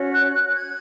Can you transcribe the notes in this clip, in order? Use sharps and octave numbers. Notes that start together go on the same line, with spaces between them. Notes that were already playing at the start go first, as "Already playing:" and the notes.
Already playing: C#4 F#4 C#5
F#6
F#6
F#6
G#6